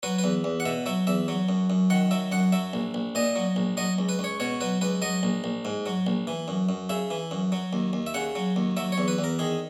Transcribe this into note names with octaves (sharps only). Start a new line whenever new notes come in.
F#3 B4
B4
E2
E2
F#5
B2 E5
F#3 E5
E2 E5
F#3
F#2
F#2
D#3 F#5
F#3 E5
F#2 F#5
F#3 E5
A#1
A#1
A#2 D#5
F#3
A#1
F#3 D#5
C#2
B4
C#2 C#5
B2 C#5
F#3 B4
C#2 B4
F#3 D#5
A#1
A#1
G#2
F#3
A#1
E3
F#2
F#2
C#3 E5
E3
F#2
F#3
D#2
D#2
E5
C#3 F#5
F#3
D#2
F#3 E5
C#5
E2
B4
E2
A#4
D#3 G#4